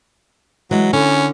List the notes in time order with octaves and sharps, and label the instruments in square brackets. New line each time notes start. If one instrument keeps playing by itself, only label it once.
[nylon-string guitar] E3 G#3 [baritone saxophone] F#3
[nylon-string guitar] D3 [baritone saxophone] C#4